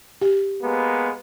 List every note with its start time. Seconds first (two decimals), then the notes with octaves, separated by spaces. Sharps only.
0.21 G4
0.62 G#3 A#3 B3